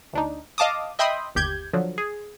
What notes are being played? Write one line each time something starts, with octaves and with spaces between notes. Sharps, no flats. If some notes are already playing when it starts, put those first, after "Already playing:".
D2 D4 D#4
D#5 F5 A5 D6 D#6
D#5 E5 G5 B5 C6 D#6
G1 D#2 G4 G6 G#6
D3 F3 F#3
G#4